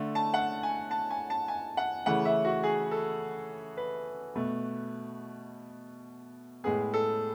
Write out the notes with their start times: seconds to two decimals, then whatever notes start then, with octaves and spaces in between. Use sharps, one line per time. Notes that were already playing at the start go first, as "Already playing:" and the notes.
Already playing: D3 A3
0.15 A5
0.34 F#5
0.63 G#5
0.91 A5
1.11 G#5
1.30 A5
1.48 G#5
1.77 F#5
2.06 C#3 E3 A3 F#5
2.25 E5
2.45 F#4
2.64 G#4
2.91 A4
3.77 B4
4.35 B2 A3
6.64 A2 G#3 B3 G#4
6.94 A4